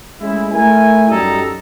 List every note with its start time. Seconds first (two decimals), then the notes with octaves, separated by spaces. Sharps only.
0.20 G#3 A3 C#4 E4
0.51 A3 E4 A#4 G#5
1.10 F#2 G3 D#4 A4 D#5 A#5